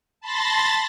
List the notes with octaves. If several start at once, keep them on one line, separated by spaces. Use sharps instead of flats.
A5 B5 C6 A6 A#6